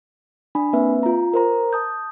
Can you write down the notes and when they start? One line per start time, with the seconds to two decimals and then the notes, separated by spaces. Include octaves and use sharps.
0.55 D4 G#5 B5
0.73 A#3 C4 B4 E5
1.03 F4 A#5
1.34 A#4 C5 A#5
1.73 A5 D#6 G6